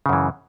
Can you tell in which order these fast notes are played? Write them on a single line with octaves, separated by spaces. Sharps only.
C#3 F#2 E3